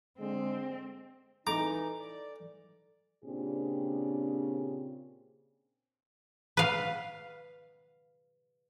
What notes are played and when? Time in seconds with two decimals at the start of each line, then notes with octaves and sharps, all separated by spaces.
0.19 D3 G#3 C4
1.47 E3 D#4 A4 A#5 D6
2.00 D5
3.25 A#2 C#3 C4 D4 G4 G#4
6.57 B4 F5